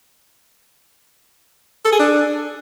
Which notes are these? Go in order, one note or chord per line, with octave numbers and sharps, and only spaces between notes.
A4
G#4
D4